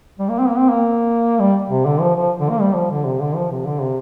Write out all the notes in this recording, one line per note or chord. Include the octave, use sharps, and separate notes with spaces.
G3
A#3
C4
A#3
C4
A#3
G3
C3
D3
F3
F3
D3
A#3
G3
F3
D3
C3
D3
F3
C3
D3
C3